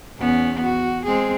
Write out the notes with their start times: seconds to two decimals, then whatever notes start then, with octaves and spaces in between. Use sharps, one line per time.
0.19 E2 B3 C#4
0.63 F#4
1.05 G#3 C4 G#4